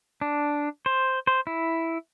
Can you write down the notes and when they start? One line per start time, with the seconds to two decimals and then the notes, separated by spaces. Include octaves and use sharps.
0.21 D4
0.86 C5
1.27 C5
1.47 E4